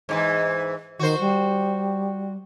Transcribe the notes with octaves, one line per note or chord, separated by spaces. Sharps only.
G#2 C#3 E3
D#3 F#4 C5
G3